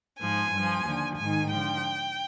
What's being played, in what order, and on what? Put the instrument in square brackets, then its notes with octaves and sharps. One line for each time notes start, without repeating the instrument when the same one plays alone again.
[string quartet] G#2 F3 G#5
G2 F3
D#2 D3 F3
G#2 D#3 G#5
D3 F3 G5